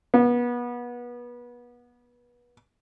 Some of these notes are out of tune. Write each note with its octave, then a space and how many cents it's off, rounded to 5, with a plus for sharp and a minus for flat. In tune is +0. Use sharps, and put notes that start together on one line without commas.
B3 -30